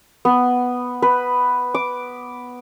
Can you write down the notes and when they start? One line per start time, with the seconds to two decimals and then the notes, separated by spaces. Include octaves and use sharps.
0.25 B3
1.02 B4
1.75 D6